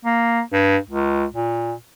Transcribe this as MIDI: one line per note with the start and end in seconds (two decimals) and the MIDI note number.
0.05 0.41 58
0.53 0.77 43
0.89 1.25 37
1.34 1.73 46